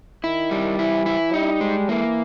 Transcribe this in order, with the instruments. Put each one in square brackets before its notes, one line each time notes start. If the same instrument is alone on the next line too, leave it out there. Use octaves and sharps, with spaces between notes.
[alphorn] D#3 [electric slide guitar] E4
[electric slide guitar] G3
[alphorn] E3 [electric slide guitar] E4
[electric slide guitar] E4
[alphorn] G3 [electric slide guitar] D#4
[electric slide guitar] G#3
[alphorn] E3 [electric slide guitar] A#3